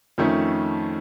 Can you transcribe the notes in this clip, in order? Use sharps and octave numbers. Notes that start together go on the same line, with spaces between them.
F2 D#3 A3 C#4